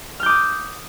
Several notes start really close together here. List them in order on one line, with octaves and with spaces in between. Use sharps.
F6 G6 D6 D#6